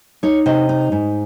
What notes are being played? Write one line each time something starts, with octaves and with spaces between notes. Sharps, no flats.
D#4 C#5
C3 D#5
D#4
G#2